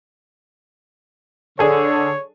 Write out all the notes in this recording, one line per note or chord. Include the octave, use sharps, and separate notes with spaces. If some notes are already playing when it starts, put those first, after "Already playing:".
D3 D4 G#4 A4 C#5